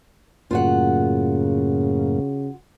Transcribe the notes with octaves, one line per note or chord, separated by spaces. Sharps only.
F#2 A2 C#3 A#3 F4 F#4 F#5